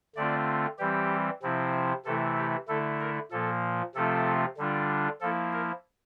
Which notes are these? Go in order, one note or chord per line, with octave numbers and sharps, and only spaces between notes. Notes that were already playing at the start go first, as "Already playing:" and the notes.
D3 A3 C4 F4 D5
E3 G3 C4 G4
C3 F3 C4 E4
C3 E3 A3 E4 A4
G4
D3 A3 E4 A4
A#4
A#2 F3 A#3 A4
C3 F3 A3 C4 F4 A4
D3 G3 D4 F4
F3 A#3 E4 A4
A#4